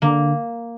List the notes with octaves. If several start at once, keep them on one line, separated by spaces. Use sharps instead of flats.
D3 A#3